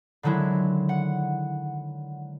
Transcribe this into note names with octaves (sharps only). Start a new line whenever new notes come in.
D3 D#3 F#3 G#3 E4
F#5